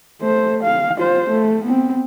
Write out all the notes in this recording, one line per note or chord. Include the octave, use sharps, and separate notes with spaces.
A3 C5
F5
F4 C5
A3
B3 C4